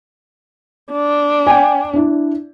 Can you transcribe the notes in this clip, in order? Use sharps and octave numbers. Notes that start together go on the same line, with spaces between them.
D4
G5 G#5
D4 E4